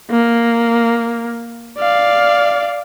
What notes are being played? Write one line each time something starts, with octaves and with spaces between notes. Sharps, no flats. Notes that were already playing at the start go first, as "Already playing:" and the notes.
A#3
D5 F5